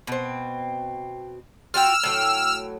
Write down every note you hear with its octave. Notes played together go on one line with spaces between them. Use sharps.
B2 C4
F4 F#4 G5 E6 F6
A2 F#3 G5